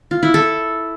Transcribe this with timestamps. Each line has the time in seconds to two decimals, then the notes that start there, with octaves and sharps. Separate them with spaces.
0.11 F4
0.23 E4
0.34 A4